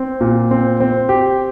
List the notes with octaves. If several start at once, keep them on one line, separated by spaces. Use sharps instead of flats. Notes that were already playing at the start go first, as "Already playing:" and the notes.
Already playing: C4
A#2
C4
C4
G4